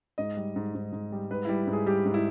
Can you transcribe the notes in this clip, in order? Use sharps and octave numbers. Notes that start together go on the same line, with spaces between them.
G#2 D#5
G3
G#2
G#2
G#2
G3
G#2 B4
G3 E4
G#2
G#4
G3 G4
G#2
E4